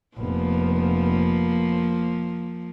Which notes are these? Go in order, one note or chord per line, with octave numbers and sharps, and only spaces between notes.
F1 F3 A#3 B3